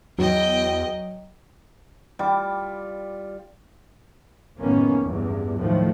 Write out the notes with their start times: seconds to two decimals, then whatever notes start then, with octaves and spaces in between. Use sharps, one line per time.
0.18 E2 F#3 D#5 G5
2.19 G3 F4 D6
4.60 F#1 A2 D#3 A#3 B3 C#4
5.04 E2 G2
5.59 D#2 A2 D#3 F3 F#3 A3